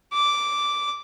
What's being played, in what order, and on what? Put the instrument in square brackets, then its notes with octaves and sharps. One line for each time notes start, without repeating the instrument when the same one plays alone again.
[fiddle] D6